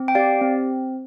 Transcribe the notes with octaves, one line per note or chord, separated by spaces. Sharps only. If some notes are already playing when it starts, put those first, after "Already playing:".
Already playing: C4
G5
G4 D5 F5
C4